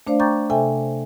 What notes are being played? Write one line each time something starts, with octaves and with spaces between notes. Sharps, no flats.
A3 D4 C5 D5 F5
G5 A#5 C#6 D6 G6 A6
C3 A4 E5 G5 G#5